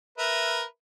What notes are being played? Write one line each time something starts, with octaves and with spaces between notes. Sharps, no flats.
A#4 B4 E5